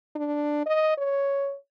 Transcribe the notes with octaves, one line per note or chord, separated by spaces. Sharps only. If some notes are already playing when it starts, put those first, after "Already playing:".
D4
D#5
C#5